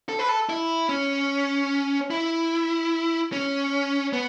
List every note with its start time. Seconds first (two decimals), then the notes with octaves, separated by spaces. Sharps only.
0.09 A4
0.19 B4
0.29 A4
0.49 E4
0.89 C#4
2.10 E4
3.33 C#4
4.13 B3